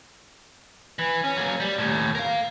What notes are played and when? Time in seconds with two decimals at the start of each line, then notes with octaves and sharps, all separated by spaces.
0.99 E3
1.24 C#4
1.37 F#3 A#3
1.60 G3
1.78 D#2 A2
2.15 A#4 F5